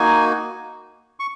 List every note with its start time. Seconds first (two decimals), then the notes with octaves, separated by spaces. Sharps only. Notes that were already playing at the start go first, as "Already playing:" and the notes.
Already playing: A#3 D#4 F#4 G#5
1.20 C#6